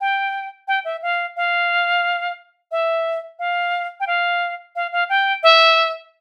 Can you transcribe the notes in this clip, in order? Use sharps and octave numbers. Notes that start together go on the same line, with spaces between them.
G5
G5
E5
F5
F5
E5
F5
G5
F5
F5
F5
G5
E5